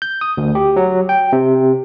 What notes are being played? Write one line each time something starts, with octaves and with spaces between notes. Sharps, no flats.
G6
D#6
D2
G4
F#3
G5
C3